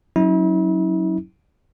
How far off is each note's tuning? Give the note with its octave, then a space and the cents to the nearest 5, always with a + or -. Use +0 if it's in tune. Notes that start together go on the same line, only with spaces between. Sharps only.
F#3 +5 C#4 +0 E4 -40